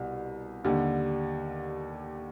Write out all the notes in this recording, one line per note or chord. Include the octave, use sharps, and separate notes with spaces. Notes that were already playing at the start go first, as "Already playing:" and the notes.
Already playing: C2 B2 G3
D#2 D3 G3